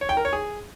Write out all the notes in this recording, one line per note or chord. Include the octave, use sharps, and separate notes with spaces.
C#5
G5
A#4
C#5
G#4